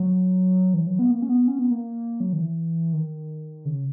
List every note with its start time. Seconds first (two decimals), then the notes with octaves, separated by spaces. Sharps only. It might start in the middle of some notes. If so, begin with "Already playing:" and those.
Already playing: F#3
0.74 E3
0.87 F#3
0.99 B3
1.11 A#3
1.22 C#4
1.29 B3
1.48 C#4
1.59 B3
1.71 A#3
2.20 F#3
2.33 D#3
2.38 E3
2.93 D#3
3.65 C#3